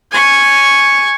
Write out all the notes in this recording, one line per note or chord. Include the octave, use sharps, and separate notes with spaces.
G#5 C#6